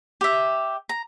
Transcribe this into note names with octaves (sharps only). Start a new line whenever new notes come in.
G4 E5
A#5